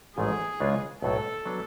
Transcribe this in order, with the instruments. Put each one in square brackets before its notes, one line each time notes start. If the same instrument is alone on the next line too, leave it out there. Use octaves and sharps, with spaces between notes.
[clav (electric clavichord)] A1 G#2 F3 A3 [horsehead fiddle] G#4
[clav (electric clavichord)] C#2 C#3 G#3 D4 F4
[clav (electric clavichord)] B1 A2 F#3 [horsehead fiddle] A4
[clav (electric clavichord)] F#3 B3 D4